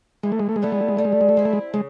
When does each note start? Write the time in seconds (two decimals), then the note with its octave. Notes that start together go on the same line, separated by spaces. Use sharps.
0.23 E3 G#3
0.32 A3
0.39 G#3
0.49 A3
0.56 G#3
0.62 G3 A3 B3 E4
0.72 G#3
0.81 A3
0.89 G#3
0.97 G3 A3
1.05 G#3
1.12 A3
1.21 G#3
1.29 A3
1.37 G#3 C4 E4
1.45 A3
1.53 G#3
1.74 C#3 G#3